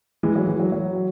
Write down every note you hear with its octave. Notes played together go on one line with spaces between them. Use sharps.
E3 G#3
F#3
E3
F#3
F#3